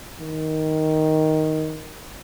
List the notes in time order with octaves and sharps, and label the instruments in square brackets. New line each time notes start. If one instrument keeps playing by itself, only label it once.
[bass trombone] D#3